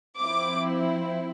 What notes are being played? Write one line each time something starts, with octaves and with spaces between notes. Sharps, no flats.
F3 C4 E4 D6